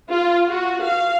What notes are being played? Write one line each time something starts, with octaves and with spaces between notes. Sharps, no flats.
F4
F#4
F5